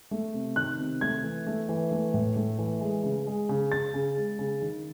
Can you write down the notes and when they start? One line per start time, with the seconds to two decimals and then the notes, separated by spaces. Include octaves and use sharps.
0.11 A3
0.34 C3
0.56 D#3 F#6
0.79 C3
1.01 A3 G#6
1.23 E3
1.47 A3
1.69 E3
1.92 A3
2.14 A2
2.36 A3
2.59 E3
2.81 G#3
3.04 C#3
3.27 G#3
3.49 C#3
3.72 C#3 A6
3.94 C#3
4.17 G#3
4.39 C#3
4.62 D#3